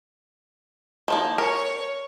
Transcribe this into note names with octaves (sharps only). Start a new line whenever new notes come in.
D#3 F3 A#3
A#4 C#5